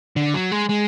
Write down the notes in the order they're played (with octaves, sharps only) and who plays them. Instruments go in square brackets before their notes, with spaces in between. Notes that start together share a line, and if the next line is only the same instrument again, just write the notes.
[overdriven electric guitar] D3
F#3
G#3
G#3